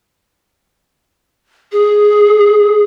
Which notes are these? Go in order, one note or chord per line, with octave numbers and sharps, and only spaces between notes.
G#4